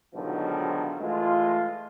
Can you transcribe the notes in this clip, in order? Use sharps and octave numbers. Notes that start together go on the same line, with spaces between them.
G#2 B2 D3 D#3 F3 F#3
E3 G#3 A3 F4